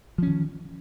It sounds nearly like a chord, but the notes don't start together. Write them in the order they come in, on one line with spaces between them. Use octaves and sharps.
F3 C#4 D#3